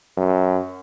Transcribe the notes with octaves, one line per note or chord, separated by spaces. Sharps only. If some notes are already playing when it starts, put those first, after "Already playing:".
F#2